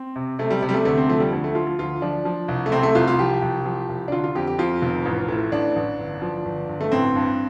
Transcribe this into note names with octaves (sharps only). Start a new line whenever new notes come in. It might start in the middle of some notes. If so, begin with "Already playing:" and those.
Already playing: C4
C3
C3 A3
G3
C3
G3
A3
D2 A3
C4
F3 A3
G3
D2
A3
F3 F4
F4
D2 F4
F3 D4
F3
C2
A3
C3 C4
A3
C2 F4
F4
F3 G4
C2
F3
C2
D4
D3 F4
F4
F2 G4
G4
F2 F4
F1
A1
A2
A1 D4
A1
G1
F3
G1
G1
A3
A1 C4
G2